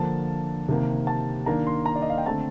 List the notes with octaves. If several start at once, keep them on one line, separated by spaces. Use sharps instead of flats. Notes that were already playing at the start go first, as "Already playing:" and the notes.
Already playing: D3 F3 A#3 D4 A5
C3 D#3 A#3
A5
D#3 A#3 D4 A#5
C6
A#5
D5
D#5
F5
G5
D3 A3 C4 A5